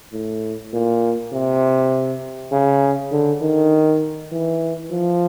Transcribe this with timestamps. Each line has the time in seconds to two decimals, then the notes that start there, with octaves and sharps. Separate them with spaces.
0.12 A2
0.73 A#2
1.33 C3
2.52 C#3
3.11 D3
3.41 D#3
4.32 E3
4.91 F3